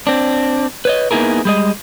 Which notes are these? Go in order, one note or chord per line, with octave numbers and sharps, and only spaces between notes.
C4 D4
B4 C#5 D#5
A#3 B3 D#4 E4 G#4 A#4
G3 G#3 D#5